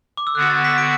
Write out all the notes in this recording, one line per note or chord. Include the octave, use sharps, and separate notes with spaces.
D6
E6
D3 B3 F#4 F#6
A6
B6
D7